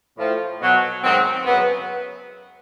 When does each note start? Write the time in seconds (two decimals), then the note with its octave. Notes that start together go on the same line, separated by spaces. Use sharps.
0.17 A2 F3
0.61 B2 F#3
1.03 G#2 D#3 F#3 C4
1.46 F#2 C#3 F#3 B3